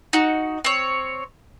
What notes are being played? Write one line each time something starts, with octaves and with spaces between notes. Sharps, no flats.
D#4 F#4
C4 C#5